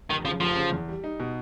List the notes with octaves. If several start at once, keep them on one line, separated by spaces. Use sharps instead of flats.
F1 D#3
C#3 F3
F1 F3
C#3
E2
G3
D#4
B2